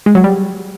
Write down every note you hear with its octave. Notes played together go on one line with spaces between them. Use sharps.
G#3
F#3
G3